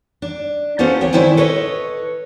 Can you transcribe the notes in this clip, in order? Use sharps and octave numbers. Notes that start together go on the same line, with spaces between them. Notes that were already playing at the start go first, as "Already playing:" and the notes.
D4
A#3 B3 C#4 F#4 A4 C5
D2 C4 C#5
D#3 A3 E4 C5 D5 G#5
A4 B4 C#5 D#5